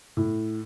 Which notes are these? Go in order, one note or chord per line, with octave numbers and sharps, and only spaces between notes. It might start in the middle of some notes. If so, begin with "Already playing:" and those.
A2